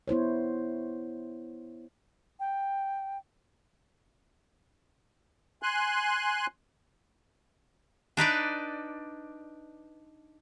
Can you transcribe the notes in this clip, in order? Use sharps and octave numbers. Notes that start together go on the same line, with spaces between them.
B3 E4 C5 C#5
G5
G#5 C6 F#6
D4 D#4 B4 D5